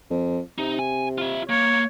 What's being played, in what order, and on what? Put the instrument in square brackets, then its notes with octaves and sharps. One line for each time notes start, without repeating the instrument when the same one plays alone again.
[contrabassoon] F2
[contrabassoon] C3 [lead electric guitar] D#4
[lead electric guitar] G#5
F4 E5
[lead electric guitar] A#3 [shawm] C#5